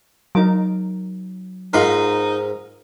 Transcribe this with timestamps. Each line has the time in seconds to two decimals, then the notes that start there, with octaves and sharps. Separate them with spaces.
0.35 F#3 D#4 A#4 D6
1.73 G#2 D#4 F4 A#4 B5 C6